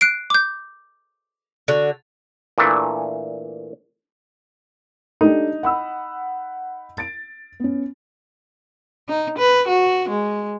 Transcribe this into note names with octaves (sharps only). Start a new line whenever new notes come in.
F#6 C7 D7
D6 G6
D3 F#4
A#2 E3 A3 D4
D4 D#4 G4 A4
F#5 B5 E6
A6 D7
B3 C#4
D#4
B4
F#4
G#3